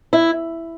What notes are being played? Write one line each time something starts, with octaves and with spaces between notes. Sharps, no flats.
E4